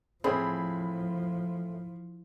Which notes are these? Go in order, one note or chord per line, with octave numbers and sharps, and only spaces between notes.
A2 F3 C4 G#4 B5